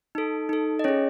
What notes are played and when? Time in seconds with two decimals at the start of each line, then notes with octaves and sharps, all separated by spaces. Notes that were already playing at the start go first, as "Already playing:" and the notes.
0.15 D#4 A4
0.49 D#4 A4
0.79 D#5
0.84 C#4 G#4 C#5